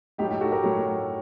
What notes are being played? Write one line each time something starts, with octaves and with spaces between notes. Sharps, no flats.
A2 F#3 D#4 G4
D#4 G4
F#4 A4
G4 A#4
A2 F#3